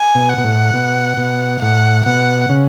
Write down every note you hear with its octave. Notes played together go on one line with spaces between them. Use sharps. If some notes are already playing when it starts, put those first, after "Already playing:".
Already playing: G#5
B2
F#5
B2
A2
B2
B2
A2 F#5
B2 F#5
C#3